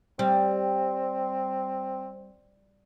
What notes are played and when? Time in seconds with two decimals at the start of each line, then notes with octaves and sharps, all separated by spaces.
0.19 G3 C4